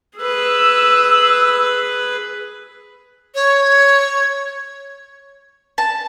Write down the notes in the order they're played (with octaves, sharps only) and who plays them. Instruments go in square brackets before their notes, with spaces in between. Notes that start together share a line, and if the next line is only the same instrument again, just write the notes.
[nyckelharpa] G#4 B4 [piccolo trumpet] E6
[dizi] C#5
[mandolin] A5